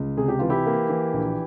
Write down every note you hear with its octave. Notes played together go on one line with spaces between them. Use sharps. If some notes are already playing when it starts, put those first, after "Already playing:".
Already playing: C#2
C3 G#4
G4
E3 F4
E4 G4
A#3
E3
A#1